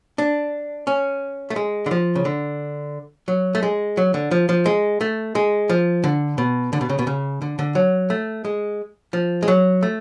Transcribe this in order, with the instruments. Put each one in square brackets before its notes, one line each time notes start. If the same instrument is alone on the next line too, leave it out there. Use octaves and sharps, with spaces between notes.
[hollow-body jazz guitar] D4
C#4
A3
G#3
D3
F3
C#3
D3
F#3
A3
G#3
F#3
D3
F3
F3
G#3
A3
G#3
F3
D3
B2
D3
B2
C#3
B2
C#3
D3
D3
F#3
A3
G#3
F3
G#3
F#3
A3